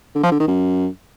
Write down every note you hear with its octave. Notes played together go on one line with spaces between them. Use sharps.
D3
F3
D3
D#3
F#2